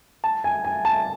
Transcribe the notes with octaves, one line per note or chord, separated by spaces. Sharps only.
A5
G#5
G#5
A5